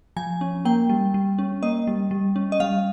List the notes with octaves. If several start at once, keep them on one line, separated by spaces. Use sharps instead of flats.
F3 G#5
C#4
A#3 G5
G3
G3
C#4
A#3 D#5
G3
G3
C#4
D#5
G3 F5